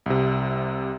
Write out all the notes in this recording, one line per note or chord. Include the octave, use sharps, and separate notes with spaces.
C2 C3